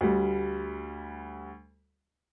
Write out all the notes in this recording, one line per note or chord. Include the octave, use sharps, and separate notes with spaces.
D2 G3